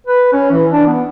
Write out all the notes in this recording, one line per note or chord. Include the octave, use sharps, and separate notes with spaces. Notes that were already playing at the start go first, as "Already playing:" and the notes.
B4
C#4
E3
D4
B3